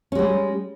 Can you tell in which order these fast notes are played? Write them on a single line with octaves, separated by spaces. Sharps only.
C#4 G#3 G3